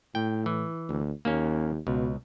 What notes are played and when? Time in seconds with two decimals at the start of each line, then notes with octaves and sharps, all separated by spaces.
0.15 A2 G5
0.46 E3
0.89 D2
1.25 D#2 A#3 C#4
1.87 C#2 B2